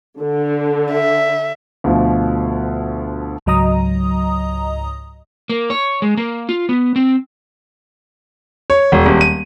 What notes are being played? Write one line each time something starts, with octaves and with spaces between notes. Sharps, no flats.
D3
E5
D2 B2 F3
C#2 G#2 F#3 D#5 A#5 D#6
A#3
C#5
G#3
A#3
F4
B3
C4
C#5
E1
D#1
D#7